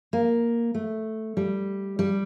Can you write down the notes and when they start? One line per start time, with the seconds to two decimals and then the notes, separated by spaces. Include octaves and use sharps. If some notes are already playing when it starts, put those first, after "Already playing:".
0.13 A#3
0.74 A3
1.37 G3
1.99 G3